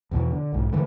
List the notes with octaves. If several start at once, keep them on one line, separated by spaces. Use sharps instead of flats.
E2 B2 D3 E3
D3
B1 G#2
D3 E3 A3